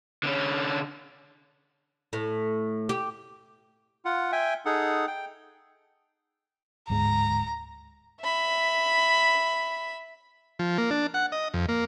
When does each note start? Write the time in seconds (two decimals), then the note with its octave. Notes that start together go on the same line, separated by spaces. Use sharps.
0.23 D3 C#4
2.13 A2
2.89 G4
4.05 F4 F#5
4.32 E5 G5 G#5
4.66 D#4 G#4 A4 F#5
5.07 G5
6.90 D1 G#2 G#3 A#5
8.21 E5 B5
10.59 F3
10.78 A#3
10.90 D4
11.14 F#5
11.32 D#5
11.54 F2
11.68 A#3